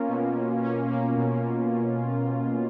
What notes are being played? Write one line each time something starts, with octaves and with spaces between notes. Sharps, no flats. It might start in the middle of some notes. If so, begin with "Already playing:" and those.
Already playing: A#3 C#4 F4
B2
F4
C#4
A#3
B2